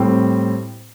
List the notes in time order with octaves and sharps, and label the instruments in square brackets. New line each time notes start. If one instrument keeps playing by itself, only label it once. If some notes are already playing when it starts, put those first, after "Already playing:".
Already playing: [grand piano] A2 G3 C4